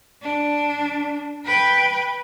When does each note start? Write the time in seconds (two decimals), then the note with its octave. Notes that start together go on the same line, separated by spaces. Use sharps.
0.23 D4
1.46 B4 G5